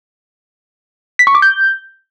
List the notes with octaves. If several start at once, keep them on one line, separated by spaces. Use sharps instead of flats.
B6
C#6
D6
G6